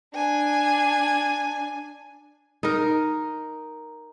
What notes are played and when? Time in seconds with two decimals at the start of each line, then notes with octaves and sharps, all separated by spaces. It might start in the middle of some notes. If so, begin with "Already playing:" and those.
0.14 D4 G#5
2.63 D#4 A#4